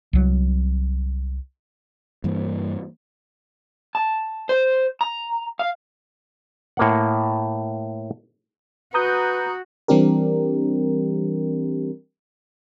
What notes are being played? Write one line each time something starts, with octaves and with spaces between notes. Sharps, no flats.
C2 F#3
G2 E3 A#3
A5
C5
A#5
F5
A2 A#3 F#5
F#4 B4 A#5 D#6 G6
E3 G3 C4 D4 G4 A#4